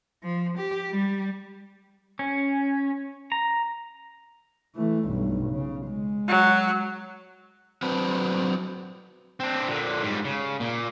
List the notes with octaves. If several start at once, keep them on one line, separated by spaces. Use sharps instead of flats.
F3
G4
G3
C#4
A#5
E3 A3
B1 G2
C#3
G#3
F#3
F#3 C4 D4 B4 C5
C4 D4
A#2 D3
G#2 G3
C#3
A#2